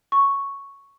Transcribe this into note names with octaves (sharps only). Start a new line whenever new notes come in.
C#6